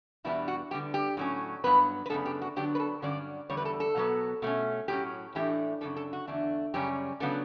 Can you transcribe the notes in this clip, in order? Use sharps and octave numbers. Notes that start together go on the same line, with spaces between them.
E2 B2 G3 B3 D4 E4
F#4
D3 G3 B3 G4
G4
A2 F#3 C#4
G2 F#3 B3 B4
B4
F#2 C#3 E3 B3 D4 A4
G4
F#4
D3 F#3 B3 D4 G4
B4
A4
G2 D3 F#3 C#4 D5
E2 D3 G3 C#5
B4
A4
A4
B2 F#3 B3
B2 A3 C#4
A2 F#3 C#4 G4
A2 E3 A3 D4 G4
F#2 C#3 G3 D4 A4
A4
F#4
E2 D3 A3 D4
F#2 C#3 G3 C#4 G4
C#3 F#3 B3 D4 A4